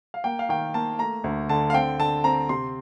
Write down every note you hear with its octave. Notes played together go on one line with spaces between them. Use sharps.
F5
A#3 G5
F5
D#3 G5
A#3 A5
A3 A#5
D2
D3 A5
F5
C4 G5
D3 A5
C4 A#5
C3 C6